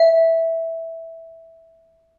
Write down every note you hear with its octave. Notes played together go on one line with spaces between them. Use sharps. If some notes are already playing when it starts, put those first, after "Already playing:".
Already playing: E5